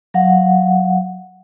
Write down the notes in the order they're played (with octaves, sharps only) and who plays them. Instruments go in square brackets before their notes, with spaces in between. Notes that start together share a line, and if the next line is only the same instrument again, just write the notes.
[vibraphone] F#3 F5 F#5